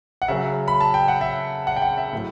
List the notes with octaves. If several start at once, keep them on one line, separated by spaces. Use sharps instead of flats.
F#5
C#3 F#3 E5
B5
A5
G5
F#5
E5
F#5
G5
F#5
E5
A2 F#3